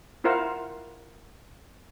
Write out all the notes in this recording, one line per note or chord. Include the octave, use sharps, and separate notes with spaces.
E4 F4 A#4 C5 F5 F#5